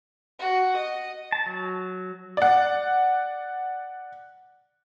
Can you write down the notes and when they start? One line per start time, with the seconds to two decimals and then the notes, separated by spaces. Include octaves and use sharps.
0.39 F#4
0.76 D#5
1.32 A5
1.46 F#3
2.37 D5 F#5